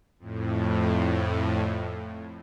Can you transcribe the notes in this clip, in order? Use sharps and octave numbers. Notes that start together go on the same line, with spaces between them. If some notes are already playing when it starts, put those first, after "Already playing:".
F2 A2